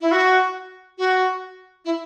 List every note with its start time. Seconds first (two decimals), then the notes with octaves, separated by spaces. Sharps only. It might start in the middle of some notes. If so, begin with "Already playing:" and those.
0.01 E4
0.12 F#4
0.98 F#4
1.85 E4